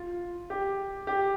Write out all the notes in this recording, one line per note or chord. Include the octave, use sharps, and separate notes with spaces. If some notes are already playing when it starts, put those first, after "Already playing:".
Already playing: F4
G4
G4